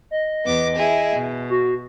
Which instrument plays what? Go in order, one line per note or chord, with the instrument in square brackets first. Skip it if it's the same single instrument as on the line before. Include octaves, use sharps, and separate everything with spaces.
[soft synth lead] D#5
[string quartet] E2 B3 D6
E4 G#4
B2
[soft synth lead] F#4